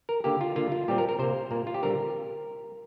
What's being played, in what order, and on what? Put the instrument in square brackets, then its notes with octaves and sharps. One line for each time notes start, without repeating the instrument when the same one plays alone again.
[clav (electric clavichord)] A#4
D3 A#3 G4
F4
D3 A#3 F4
F4
A#2 G3 C4 G4
A#4
A#4
C3 A#3 C5
A#2 A#3
F4
G4
D3 G3 C4 A#4